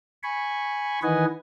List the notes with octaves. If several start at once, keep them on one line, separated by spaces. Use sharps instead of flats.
G#5 B5 C#6
D#3 E3 B4 D#5 F#5 G#5